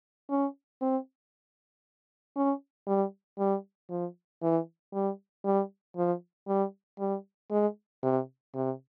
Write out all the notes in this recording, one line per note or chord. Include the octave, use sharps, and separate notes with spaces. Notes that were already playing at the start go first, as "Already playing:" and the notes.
C#4
C4
C#4
G3
G3
F3
E3
G3
G3
F3
G3
G3
G#3
C3
C3